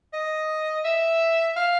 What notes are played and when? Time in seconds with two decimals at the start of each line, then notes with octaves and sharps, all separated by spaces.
0.13 D#5
0.85 E5
1.56 F5